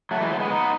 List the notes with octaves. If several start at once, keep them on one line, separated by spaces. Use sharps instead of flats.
F#3 A3
E3 G#3
F#3 A3
G#3 B3
B3 D#4